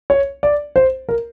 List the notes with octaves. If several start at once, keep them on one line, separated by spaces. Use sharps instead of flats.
C#5
D5
C5
A#4